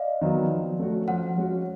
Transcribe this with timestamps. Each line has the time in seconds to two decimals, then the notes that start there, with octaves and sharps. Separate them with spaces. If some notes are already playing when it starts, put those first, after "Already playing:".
Already playing: D5 D#5 F5
0.21 D#3 F#3 B3
0.50 F3
0.79 A3 C#4 F#4
1.08 F3 F#5
1.37 G#3 C#4 F#4